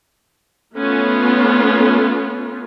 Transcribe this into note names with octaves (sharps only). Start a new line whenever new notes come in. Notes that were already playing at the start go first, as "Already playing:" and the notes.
A3 B3 C#4 F4